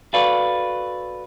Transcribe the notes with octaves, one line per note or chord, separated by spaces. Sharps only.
F#4 A4 B4 D5 F5